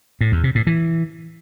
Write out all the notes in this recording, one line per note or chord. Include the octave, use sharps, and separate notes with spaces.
A2
E2
C3
A2
E3